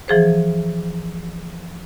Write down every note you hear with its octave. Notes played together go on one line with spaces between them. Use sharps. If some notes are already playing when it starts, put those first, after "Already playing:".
E3 F3 G#4 C5